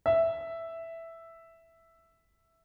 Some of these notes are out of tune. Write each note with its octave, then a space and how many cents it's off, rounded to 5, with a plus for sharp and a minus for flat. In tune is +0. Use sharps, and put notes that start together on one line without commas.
E5 +0